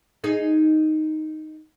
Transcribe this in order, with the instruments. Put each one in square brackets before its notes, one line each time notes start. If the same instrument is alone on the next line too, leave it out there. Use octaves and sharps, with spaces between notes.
[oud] D#4 G#4 D#5